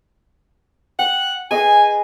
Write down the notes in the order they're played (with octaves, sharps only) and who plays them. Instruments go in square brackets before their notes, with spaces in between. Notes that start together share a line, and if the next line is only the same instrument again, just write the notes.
[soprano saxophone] F#5 [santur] G5
[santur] G#4 B4 D#5 [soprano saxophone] G#5